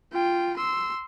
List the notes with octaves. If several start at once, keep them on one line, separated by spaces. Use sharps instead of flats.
F4 G5
C6 E6